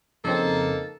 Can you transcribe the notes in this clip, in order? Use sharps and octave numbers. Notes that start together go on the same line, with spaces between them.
F2 C#3 A#3 C4 D#4 A4